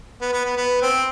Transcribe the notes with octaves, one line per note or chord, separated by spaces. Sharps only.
B3
B3
B3
B3
C4